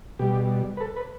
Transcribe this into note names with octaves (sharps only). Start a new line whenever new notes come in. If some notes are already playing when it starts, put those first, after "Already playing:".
B2 G3 G4
B4
A4
B4